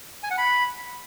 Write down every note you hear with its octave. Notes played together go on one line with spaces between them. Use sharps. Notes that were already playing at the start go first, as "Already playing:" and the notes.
G#5
F#5
B5